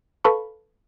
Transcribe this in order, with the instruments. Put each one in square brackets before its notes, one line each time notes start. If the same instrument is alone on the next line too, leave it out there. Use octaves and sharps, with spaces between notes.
[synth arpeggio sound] A4 B4 F5 A5 B5 C#6